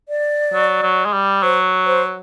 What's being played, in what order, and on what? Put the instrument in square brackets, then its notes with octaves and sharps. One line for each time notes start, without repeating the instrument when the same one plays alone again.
[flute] D5
[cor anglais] F#3
F#3
G#3
G3
[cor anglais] F#3 [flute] C5
[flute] C5